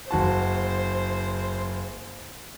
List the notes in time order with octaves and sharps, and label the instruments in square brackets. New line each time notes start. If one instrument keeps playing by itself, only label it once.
[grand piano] F#1 F#4 A5 [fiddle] C5